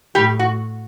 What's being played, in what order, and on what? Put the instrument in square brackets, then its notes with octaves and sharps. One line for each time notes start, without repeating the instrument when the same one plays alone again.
[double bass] A2 [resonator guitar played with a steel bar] G3 G4
[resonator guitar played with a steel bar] F#4